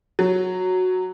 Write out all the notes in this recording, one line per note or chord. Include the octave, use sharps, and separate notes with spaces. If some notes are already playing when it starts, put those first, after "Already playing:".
F#3